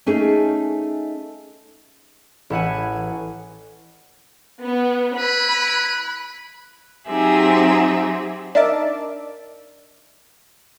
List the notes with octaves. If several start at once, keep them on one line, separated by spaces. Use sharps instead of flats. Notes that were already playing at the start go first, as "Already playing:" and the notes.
A3 C#4 D#4 G#4
A1 E4 F#5 G#5
B3
E4 B4 B5
F#3 C4 D#4 G4 G#4 E5
D4 D#4 A#4 E5 A5 D6